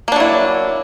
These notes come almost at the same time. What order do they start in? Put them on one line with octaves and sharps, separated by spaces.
A#3 D4 F#3 E4